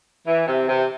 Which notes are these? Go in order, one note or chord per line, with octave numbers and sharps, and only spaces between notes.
E3
C3
C3